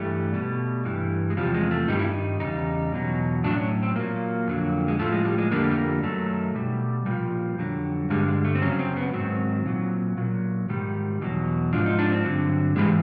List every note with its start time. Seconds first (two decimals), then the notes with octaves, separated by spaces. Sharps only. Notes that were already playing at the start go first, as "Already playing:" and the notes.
Already playing: G2 E3 G3 A3
0.33 B2 G3
0.85 G2 E3 G3
1.30 G#3
1.37 E2 C3 F3 G3
1.54 G#3
1.71 A3
1.88 G2 D#3 G3 D#4
1.99 E4
2.10 D#4
2.40 E2 C#3 G3 D#4
2.92 E2 B2 F#3
3.44 A2 F#3 D4
3.57 C#4
3.83 C4
3.96 A#2 F#3 A#3
4.47 F2 D3 F#3
4.88 G#3
4.99 A2 F3 A3
5.12 G#3
5.25 G3
5.38 G#3
5.51 F2 D3 G3 A#3
5.71 A3
5.76 A#3
6.03 F#2 D#3 F#3 A3
6.55 B2 G3
7.06 A#2 F3 G3
7.58 F2 D3 F#3
8.10 G2 D3 G3 G#3
8.28 G#3
8.44 A3
8.55 C4
8.62 F#2 C#3 F#3 C#4
8.72 C#4
8.79 C4
8.97 B3
9.13 G#2 D#3 F#3 C4
9.66 A#2 F#3
10.17 A#2 F#3
10.69 G#2 D#3 G3
11.21 E2 B2 F#3
11.73 G#2 F3 D4
11.86 D#4
11.99 D4
12.12 C4
12.25 G2 D3 F#3
12.76 G#2 E3 G3 G#3